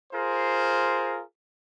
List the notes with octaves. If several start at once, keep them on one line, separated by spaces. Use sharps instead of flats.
F4 G#4 A#4 C5